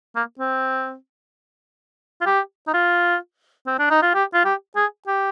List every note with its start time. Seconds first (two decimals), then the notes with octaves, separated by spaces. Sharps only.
0.16 A#3
0.39 C4
2.21 F4
2.26 G4
2.67 D#4
2.74 F4
3.66 C4
3.79 D4
3.90 D#4
4.02 F4
4.14 G4
4.34 F4
4.45 G4
4.76 G#4
5.07 G4